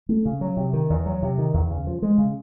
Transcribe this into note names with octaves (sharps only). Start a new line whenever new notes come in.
A3
C#3
F#3
C3
D#3
E2
F#3
C3
D#3
E2
C#3
F3
G#3
C#3